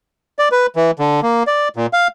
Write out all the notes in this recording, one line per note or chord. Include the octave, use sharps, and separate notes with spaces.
D5
B4
E3
D3
A#3
D5
A#2
F5